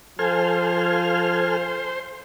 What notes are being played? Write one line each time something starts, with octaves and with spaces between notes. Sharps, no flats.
F3 A4 C5 G#5 F6